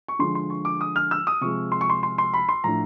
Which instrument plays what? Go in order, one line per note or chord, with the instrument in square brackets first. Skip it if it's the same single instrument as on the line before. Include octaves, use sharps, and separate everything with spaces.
[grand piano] C#6
D3 F3 G#3 C6
C6
C#6
D6
D#6
F6
E6
D#6
C3 F3 G#3 C#6
C6
C#6
C6
C6
C6
B5
C6
A2 F3 A3 D4 A#5